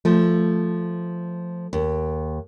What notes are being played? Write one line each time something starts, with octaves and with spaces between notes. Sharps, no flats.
F3 A3
D#2